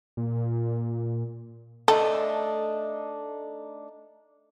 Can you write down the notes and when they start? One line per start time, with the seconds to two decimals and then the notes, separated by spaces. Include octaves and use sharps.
0.17 A#2
1.88 A3 D4 D#4 A4